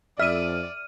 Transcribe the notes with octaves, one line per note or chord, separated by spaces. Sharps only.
F2 D5 E5 F6 D#7